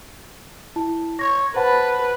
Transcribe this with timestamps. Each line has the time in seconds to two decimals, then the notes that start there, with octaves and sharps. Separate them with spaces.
0.76 E4 A5
1.19 C#5 A#6
1.55 B4 C5 F#5 A5 B5